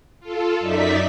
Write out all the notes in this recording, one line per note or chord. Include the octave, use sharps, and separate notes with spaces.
F4 A4
F#2 D#4 D5 E5 B6